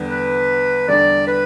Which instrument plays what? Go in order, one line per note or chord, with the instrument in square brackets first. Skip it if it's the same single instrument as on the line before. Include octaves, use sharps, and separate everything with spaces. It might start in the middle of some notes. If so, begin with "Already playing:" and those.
Already playing: [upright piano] E2 D3 G3 B3
[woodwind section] B4
[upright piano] E2 D3 G3 D4 [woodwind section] D5
[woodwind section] B4